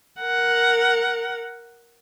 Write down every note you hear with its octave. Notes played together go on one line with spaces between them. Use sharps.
A#4 F#5